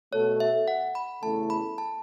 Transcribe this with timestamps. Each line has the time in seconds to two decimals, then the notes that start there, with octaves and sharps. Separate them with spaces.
0.12 B2 A3 F#4 A4 C#5
0.40 E5
0.68 F#5
0.95 B5
1.23 E2 C#3 A3 E4 A4 A5
1.50 B5
1.78 A5